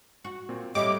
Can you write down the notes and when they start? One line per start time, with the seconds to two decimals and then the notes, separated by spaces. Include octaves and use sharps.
0.25 F#4
0.49 A#2 C4
0.75 A2 G3 G4 C#5 D#5 E5 D6